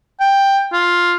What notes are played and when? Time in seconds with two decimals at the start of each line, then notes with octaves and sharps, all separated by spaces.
0.20 G5
0.73 F4